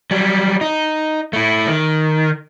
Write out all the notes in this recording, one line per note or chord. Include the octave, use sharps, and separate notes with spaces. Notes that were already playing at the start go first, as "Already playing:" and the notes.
F#3 G3
D#4
A3 E4
D#3